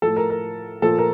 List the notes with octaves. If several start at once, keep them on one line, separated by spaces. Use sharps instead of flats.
A2 F3 A4
A#4
A#4
A#2 F3 A4
A#4